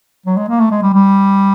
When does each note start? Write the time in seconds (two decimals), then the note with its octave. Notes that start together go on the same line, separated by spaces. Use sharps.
0.26 F#3
0.37 G#3
0.49 A#3
0.60 A3
0.71 G#3
0.83 G3
0.94 G3